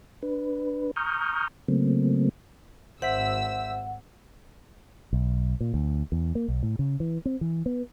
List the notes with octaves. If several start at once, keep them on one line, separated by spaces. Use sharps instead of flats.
D4 B4
A#5 C#6 D#6 F6 G6
C#3 F#3 A3 A#3 C4
G#1 C5 E5 F#5 E6 B6
B1
A#2
D2
E2
A#3
B1
A2
C#3
E3
C4
E3
B3